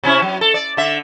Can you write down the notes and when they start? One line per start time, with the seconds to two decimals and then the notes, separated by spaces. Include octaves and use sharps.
0.03 C3 C#4 E4
0.22 F#3
0.41 A4
0.54 D5
0.77 D3 E5